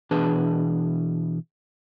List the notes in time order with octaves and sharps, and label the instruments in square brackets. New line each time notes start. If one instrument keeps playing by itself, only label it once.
[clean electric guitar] B2 E3 D4 G#4 B4 A5